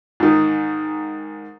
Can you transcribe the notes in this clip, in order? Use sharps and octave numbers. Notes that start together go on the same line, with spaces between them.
G#2 D#3